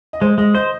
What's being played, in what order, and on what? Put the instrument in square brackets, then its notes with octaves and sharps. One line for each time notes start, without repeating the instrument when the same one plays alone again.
[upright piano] D#5
[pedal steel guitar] G#3 [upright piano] C5
[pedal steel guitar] G#3 [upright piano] D#5
[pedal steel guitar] C5 [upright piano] D#5